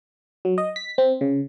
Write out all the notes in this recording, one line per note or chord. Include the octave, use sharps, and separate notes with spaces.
F#3
D#5
B6
C4
C#3